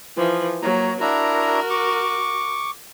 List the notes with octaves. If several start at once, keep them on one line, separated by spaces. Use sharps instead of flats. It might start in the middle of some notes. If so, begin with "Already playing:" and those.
E3 F3
F#3 A#3 A#5
D4 E4 F#4 A#4 A#5
C#6 D6